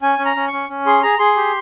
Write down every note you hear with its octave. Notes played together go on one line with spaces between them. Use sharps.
C#4 G#5
C#4
A#5
C#4
C#6
C#4
C#4
G#4 C6
G#4 A#5
G#4 C6
G4